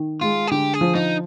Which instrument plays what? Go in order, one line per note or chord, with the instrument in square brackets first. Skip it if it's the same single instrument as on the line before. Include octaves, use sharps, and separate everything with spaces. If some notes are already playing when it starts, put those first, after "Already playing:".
Already playing: [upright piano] D#3
[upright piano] G#3 [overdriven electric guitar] F4
[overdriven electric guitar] G#4
[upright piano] D3 [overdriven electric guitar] G4
[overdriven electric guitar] G#4
[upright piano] F3
[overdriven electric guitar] D#4